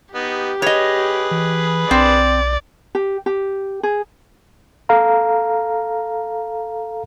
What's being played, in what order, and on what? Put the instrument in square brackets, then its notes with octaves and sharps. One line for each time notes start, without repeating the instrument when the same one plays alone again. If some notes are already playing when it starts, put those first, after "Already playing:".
[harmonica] B3 D#4 [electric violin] G4
[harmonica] G#4 B4 [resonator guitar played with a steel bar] C#5 D#5
[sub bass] E3
[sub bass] B1 [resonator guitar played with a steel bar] C4 [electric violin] D5
[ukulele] G4
G4
G#4
[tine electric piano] A4 F5 A#5